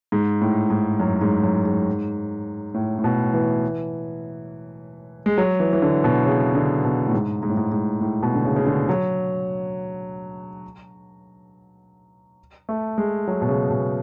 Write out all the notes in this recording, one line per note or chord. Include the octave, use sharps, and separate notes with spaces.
G#2
A2
G#2
F#2
G#2
F#2
G#2
A2
A2
B2
E3
G#3
F#3
E3
E3
D3
B2
C#3
D3
B2
A2
G#2
G#2
A2
G#2
G#2
A2
B2
D3
C#3
C#3
D3
F#3
A3
G#3
F#3
B2
C#3
B2